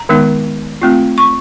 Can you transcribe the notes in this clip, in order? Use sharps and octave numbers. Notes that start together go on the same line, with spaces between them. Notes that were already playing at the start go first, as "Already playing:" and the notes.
Already playing: A#5
D#3 G#3 B3 D#4
A3 C4 F4
C#6